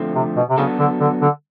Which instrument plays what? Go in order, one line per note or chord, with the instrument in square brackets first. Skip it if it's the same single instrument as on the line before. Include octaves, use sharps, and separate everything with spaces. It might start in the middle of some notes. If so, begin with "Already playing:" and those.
Already playing: [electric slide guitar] F2 D3 F3 A3 C4
[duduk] C3
B2
C3
[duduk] C#3 [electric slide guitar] F#3 B3 D4 F#4 A4
[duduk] D3
D3
D3